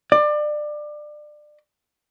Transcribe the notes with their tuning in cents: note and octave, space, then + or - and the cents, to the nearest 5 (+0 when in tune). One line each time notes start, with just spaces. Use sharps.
D5 +25